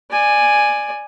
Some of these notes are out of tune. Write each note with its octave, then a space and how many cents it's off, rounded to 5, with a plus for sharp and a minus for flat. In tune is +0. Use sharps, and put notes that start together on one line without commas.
D5 +15 G#5 +0